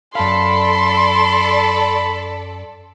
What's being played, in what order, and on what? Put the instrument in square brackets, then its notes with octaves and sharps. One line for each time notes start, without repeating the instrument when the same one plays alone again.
[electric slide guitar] F#2 F5 [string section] A4 D5 [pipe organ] B5 [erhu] C6